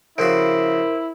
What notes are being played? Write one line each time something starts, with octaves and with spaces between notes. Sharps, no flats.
C#3 F3 E4 F#4 A#4 C5 D7